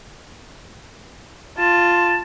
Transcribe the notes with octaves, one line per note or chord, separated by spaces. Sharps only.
F4 A5